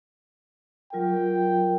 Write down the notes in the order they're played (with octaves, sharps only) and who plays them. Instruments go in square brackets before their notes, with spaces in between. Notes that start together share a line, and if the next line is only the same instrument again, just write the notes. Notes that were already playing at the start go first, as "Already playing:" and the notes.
[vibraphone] F#3 F4 A#4 [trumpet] G5